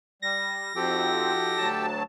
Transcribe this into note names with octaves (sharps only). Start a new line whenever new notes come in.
G3 A#6
F2 F3 C4 D#4 F#4 G4 A4 G5
D2 F#3 A5